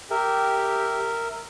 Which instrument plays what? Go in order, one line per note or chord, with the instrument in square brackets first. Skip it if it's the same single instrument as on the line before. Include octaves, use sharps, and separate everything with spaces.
[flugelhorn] G4 [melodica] A#4 E5